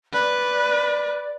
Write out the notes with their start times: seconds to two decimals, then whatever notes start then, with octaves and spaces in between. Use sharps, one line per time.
0.13 B4 D5